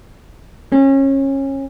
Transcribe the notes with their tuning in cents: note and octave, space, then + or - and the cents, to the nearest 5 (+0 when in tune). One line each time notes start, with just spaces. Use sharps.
C#4 -25